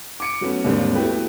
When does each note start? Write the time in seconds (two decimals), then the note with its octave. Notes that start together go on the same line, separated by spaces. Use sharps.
0.20 D6 C#7 D7
0.41 F#3 A3 B3 C#4
0.64 D#2 G#2 D3 G3 A#3 C4
0.95 A3 B3 E4 F#4 G4 B4